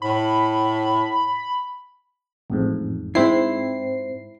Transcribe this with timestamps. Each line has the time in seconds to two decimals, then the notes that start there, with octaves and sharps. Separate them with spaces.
0.02 A2 B5
2.50 A1 F2 G#2
3.15 G#2 C4 E4 C7